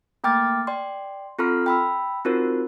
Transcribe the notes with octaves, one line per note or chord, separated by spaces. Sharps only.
A3 A#3 G5 D6 F6 A6
D5 G5 C6
C4 F4 A4 A#5 C6 F6
G5 B5 E6
C4 D#4 F4 F#4 A#4 C5